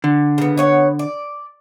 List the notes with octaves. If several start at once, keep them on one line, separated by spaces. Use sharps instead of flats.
D3
C#3 B3
B3 C#5 F#5
D5